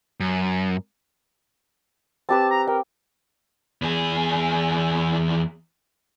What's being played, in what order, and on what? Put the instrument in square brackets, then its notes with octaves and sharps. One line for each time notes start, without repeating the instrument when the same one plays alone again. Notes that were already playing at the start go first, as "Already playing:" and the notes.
[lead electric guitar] F#2
[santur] C4 G4 B4 [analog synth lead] A5
[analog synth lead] A#5
[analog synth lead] A#4 [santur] G5
[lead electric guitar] E2 G#4